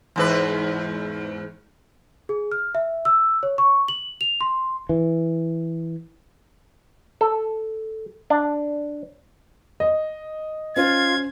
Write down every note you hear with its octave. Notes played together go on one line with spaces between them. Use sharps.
E2 G#2 B4
G#4
F6
E5
E6
C#5
C#6
F#7
F7
C6
E3
A4
D4
D#5
C#4 F4 C5 G#6